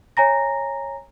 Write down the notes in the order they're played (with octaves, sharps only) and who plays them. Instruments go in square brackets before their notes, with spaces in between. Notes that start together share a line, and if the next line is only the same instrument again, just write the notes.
[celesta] C#5 G#5 A#5 A#6